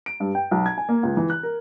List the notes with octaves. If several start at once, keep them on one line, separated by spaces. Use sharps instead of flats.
D7
G2
G5
B1
G#6
G#5
A#3
C#2
E3
F#6
A#4